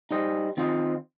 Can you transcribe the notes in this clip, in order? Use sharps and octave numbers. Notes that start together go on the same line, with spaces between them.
G3 D#4 C5 D#5
D#3 C4 F4 C5 D#5